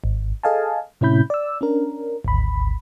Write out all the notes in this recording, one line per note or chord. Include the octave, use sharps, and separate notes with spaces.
G#1
G#4 A4 D#5 F5 G#5 A5
A2 C3 C#4 E4 B5 G6
D5 E6
C#4 D4 A#4
G#1 D2 B5